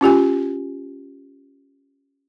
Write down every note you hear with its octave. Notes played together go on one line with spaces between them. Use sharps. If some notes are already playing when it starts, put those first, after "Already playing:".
C#4 F4 G4 G#5